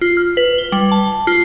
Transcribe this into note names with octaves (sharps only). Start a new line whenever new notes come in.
F4
F6
B4
G7
G3
A5
F4